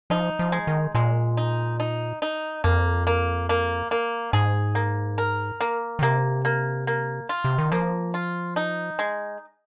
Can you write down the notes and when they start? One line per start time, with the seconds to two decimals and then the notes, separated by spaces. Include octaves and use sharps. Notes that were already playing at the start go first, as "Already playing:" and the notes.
0.10 F3 D#4
0.39 F3
0.52 G#3
0.67 D#3
0.95 A#2 G#3
1.37 D#4
1.80 D#4
2.22 D#4
2.64 F2 A#3
3.07 A#3
3.49 A#3
3.91 A#3
4.33 G#2 G#4
4.75 A#3
5.18 A#4
5.61 A#3
5.99 D#3
6.02 C3 A#3
6.45 A#3
6.87 A#3
7.29 F4
7.44 C3
7.58 D#3
7.72 F3 A#3
8.14 F4
8.56 D#4
8.99 G#3